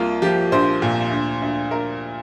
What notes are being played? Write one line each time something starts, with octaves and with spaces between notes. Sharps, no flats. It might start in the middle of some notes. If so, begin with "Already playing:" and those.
Already playing: C2 A#3 F4
F3 G4
A#1 C5
A#2
D2
D2
D2 A#4